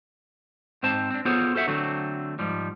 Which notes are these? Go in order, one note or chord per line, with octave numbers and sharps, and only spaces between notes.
G#2 C4 C5 A5
C4 D4
B3 F4 G#4 A4 C5 C#5
F#4 A4 C5 E5 F#5
D3 F#3 A3 C4
G#2 F3 G3